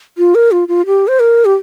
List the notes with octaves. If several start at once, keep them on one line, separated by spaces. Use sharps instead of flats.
F4
A#4
F4
F4
G4
C5
A#4
G4